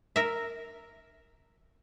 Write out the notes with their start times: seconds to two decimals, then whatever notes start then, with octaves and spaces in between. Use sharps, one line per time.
0.16 A#4 E5